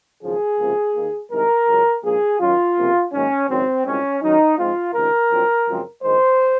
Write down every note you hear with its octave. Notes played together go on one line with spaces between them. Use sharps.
G#1 F#2 C#3 F3 G#4
C#2 C3 F3 A#3
D#2 D#3 A#3
C2 C3 D#3 G#3 A#4
C#2 C#3 F#3
A#1 G#2 F3 A#3 G#4
F#2 D#3 F#3 F4
C#2 C3 F3 A#3
G#2 D#3 F#3 A#3 C#4
G#1 F#2 C#3 F#3 C4
C2 A#2 G#3 C4 C#4
F#2 D#3 F#3 D#4
G#2 F3 G#3 C4 F4
C#2 C3 D#3 A#4
A#1 A#2 F#3 C4
F#2 C#3 F3 G#3 C4
A#1 G#2 D#3 G#3 C5